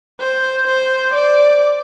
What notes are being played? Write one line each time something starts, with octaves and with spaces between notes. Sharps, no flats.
C5
C5
D5